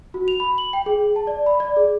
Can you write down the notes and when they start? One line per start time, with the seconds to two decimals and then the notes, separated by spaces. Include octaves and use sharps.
0.14 F#4
0.28 F7
0.40 B5
0.58 F#7
0.73 G5
0.86 G#4
1.16 A5
1.27 D5
1.46 B5
1.60 D5
1.76 G#4